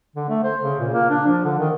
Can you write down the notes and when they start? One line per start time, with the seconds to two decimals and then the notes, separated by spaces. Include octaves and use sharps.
0.16 D3
0.30 A3
0.44 C5
0.63 C#3
0.80 A#2
0.94 A#3
1.10 D4
1.27 F3
1.44 D3
1.59 D#3